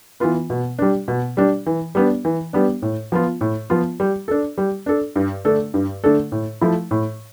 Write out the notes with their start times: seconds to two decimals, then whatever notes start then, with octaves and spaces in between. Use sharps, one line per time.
0.20 E3 B3 F4 B4
0.50 B2
0.79 G3 D4
1.08 B2
1.37 G3 D4
1.66 E3
1.95 G3 B3 D4
2.25 E3
2.53 G3 B3 D4
2.82 A2
3.12 F3 B3 F4
3.41 A2
3.70 F3 B3 F4
4.00 G3
4.28 D4 A4
4.58 G3
4.86 D4 A4
5.16 G2
5.45 D3 A3 D4 A4
5.74 G2
6.04 D3 A3 D4 A4
6.32 A2
6.61 F3 A3 E4
6.91 A2